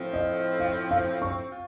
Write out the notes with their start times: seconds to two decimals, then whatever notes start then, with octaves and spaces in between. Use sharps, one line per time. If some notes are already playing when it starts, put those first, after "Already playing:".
Already playing: A2 F3 C4
0.14 D#5
0.60 F5
0.91 F5
1.22 C#6
1.52 F4